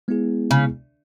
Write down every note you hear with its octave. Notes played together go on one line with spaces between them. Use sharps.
G#3 B3 E4 G#4
C#3